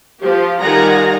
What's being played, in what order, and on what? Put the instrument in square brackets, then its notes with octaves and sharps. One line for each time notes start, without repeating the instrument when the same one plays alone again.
[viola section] F3 G4
D#3 G3 F4 F#5 G#5 A#5